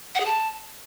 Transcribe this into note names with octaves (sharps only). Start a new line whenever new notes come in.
F#5
G#4
A5